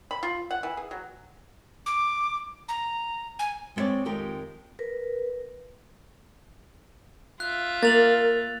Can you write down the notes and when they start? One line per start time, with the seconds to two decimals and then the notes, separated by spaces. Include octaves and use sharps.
0.11 B5
0.23 F4
0.51 F#5
0.63 E3
0.77 G#4
0.91 F#3
1.86 D6
2.68 A#5
3.39 G#5
3.76 G#3 B3 C4 C#5 D5
4.05 F2 D#3 G#3 G4 A#4 G5
4.79 A#4 B4
7.40 F4 E5 F#6
7.83 A#3 A#4 A6 F7 F#7